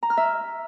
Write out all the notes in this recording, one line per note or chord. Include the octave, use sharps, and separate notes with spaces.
A#5
F6
E5